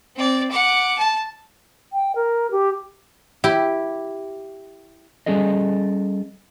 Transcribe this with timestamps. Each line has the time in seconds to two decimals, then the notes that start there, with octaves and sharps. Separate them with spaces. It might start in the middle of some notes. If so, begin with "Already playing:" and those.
0.17 C4 D5
0.51 F#5 D6
0.98 A5
1.93 G5
2.15 A#4
2.51 G4
3.44 E4 G4
5.26 G3 C#4 G#4 A4 D#5